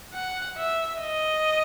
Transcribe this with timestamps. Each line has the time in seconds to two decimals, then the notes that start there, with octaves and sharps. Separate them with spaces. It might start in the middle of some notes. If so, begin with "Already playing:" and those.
0.14 F#5
0.57 E5
1.01 D#5